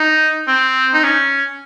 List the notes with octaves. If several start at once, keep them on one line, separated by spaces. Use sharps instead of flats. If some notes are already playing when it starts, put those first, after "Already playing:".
Already playing: D#4
C4
D#4
C#4